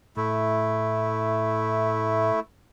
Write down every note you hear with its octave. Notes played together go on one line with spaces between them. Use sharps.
A2 A3 E4